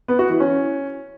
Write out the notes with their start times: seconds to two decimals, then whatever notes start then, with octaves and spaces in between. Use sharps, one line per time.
0.08 B3
0.19 F#4
0.30 E3
0.40 C#4